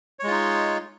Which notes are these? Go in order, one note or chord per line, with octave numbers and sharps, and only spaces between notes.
G#3 D#4 F4 C#5